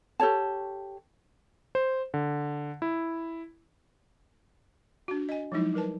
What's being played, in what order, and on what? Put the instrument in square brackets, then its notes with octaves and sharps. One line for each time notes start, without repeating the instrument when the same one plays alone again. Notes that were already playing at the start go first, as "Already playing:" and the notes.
[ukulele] G4 A4 C#5 A5
[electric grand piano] C5
D3
E4
[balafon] D4 F#4
D#5 G#5
F3 F#3 G#3 D#4 E4
G3 A#4 B4 A5